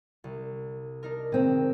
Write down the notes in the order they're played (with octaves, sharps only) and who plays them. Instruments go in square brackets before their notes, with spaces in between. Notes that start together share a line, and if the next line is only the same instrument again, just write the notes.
[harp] C2
D4 D#4 A#4
[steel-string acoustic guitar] D#3 C4 [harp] G#4